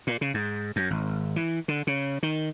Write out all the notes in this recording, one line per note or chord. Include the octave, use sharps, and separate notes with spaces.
A#2
C#3
G#2
F#2
G#1
E3
D3
C#3
D#3